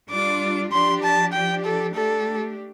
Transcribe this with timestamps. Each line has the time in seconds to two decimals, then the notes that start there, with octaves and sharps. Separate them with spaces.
0.10 G3 D4 F4 D6
0.72 F3 D4 G4 C6
1.03 A5
1.33 F3 D4 G4 G5
1.65 A4
1.95 A3 D4 G4 A4